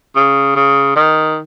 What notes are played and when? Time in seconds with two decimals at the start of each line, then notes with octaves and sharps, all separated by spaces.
0.16 C#3
0.56 C#3
0.96 D#3